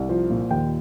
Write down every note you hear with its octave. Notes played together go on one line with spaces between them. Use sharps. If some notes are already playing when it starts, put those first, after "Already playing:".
Already playing: C2
F3
A#2
D#2 G5